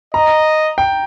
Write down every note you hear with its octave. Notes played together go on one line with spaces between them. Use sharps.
D#5 A#5
G5